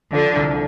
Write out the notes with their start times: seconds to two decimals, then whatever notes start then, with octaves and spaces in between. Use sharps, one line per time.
0.13 D3 F3
0.36 C2